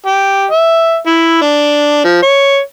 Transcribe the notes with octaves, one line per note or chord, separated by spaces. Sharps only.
G4
E5
E4
D4
F3
C#5